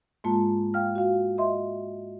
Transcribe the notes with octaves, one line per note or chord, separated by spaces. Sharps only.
G#2 G#3 A#3 F4 A5
F5 G5 F6
F#4 F5
D#5 E5 C6